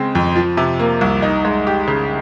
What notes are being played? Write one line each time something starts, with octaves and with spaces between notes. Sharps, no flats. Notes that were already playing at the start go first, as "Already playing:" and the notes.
Already playing: C#3 G#3 C4
F2
F3
C3
A#3
C2
D#4
G#3
G4
C#3